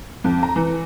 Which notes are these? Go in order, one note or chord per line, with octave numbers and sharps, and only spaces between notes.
F2
A#5
E3